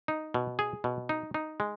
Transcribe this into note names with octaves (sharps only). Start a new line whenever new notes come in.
D#4
B2
G#4
B2
D#4
D#4
G#3